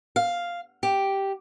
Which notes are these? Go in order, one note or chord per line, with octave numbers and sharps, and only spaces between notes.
F5
G4